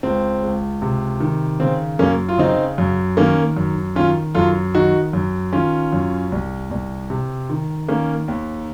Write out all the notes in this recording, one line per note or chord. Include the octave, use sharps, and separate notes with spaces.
C#2 C4
C#2
C3
D#3
C#3 C4
F#2 A#3 C#4
F4
C#3 C4 D#4
F#2
D#3 A#3 C#4
F#2
D#3 C#4 F4
F#2 F4 A4
D#3 D#4 F#4
F#2
D#3 C#4 F4
F#2
C2
C2
C3
D#3
D#3 A#3 C#4
D#2